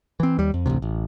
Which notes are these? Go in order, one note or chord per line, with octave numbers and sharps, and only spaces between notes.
E3 C4
D#2 G3
F2
A1 D2 A2 C3
A1